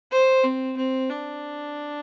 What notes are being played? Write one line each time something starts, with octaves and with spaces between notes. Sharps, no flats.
C5
C4
C4
D4